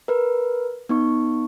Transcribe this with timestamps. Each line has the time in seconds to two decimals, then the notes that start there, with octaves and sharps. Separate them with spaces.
0.08 A#4 B4
0.89 B3 D#4 C#6